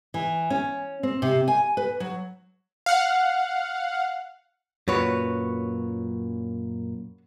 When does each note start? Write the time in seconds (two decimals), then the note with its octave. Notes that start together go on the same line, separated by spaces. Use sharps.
0.14 E3
0.50 C#4
1.03 C4
1.22 C3
1.48 G#5
1.77 B4
2.00 F#3
2.86 F5 F#5
4.88 F#2 A#2 F#4 B4 C#5